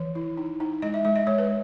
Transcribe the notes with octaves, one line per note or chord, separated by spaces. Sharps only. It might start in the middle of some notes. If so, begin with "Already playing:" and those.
Already playing: E3 C#5
E4
D#4
D#4
G#3 D#5
E5
G#3 E5
D#5
G#3 C#5
B4